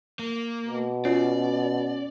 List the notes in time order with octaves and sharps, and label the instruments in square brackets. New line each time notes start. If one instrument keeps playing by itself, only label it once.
[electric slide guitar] A#3
[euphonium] B2
[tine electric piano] C#4 [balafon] F4 [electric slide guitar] D5